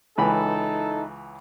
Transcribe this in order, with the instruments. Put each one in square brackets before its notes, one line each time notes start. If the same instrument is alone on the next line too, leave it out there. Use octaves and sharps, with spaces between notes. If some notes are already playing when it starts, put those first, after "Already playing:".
[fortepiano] C#2 E3 B5 [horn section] D#4 E4 A4